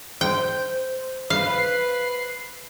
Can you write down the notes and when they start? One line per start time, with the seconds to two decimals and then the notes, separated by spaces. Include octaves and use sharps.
0.21 C5 G5
1.30 B4 F5 C7